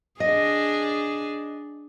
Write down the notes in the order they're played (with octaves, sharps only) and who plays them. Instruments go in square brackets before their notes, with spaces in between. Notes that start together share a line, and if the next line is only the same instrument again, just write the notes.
[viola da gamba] D4 G#4 [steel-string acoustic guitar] D#5